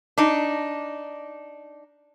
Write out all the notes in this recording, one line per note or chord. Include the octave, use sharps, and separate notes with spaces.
D4 D#4